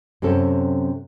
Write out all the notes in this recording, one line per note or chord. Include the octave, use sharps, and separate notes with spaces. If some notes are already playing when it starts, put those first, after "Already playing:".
F#2 C3 C4 C#4 A4